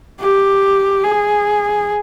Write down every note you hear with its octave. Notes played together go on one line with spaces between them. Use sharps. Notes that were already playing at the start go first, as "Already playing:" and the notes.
G4
G#4